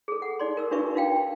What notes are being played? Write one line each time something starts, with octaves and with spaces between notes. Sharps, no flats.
G#4 A4
F#5
D#4 D5 C6
A#4 E6
D4 D#4 F#4 B4 E5 C#6
D#4 F#4 F5 G5